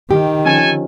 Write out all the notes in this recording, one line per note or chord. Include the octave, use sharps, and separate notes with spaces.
D#3 G4
D3 F3 C#4 A4 G#5